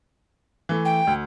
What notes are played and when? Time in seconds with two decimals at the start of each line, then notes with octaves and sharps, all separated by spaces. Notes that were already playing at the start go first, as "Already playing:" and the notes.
0.69 E3 A3
0.85 G5
1.07 D2